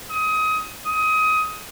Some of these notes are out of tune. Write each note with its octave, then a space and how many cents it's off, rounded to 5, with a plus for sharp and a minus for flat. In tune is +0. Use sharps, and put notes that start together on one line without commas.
D#6 +25
D#6 +20